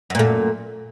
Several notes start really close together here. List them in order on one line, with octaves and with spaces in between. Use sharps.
F#2 A#2 A3